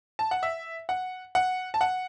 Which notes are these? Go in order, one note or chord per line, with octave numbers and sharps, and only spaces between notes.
A5
F#5
E5
F#5
F#5
A5
F#5